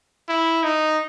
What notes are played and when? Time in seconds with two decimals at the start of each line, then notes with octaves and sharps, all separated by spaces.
0.29 E4
0.63 D#4